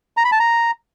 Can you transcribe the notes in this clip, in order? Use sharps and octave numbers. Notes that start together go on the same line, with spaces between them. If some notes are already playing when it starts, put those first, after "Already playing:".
A#5
B5
A5
A#5